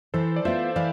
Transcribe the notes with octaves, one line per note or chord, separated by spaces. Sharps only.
E3 A4 C5
D5
B3 F4 C5 E5
E3 D5 F5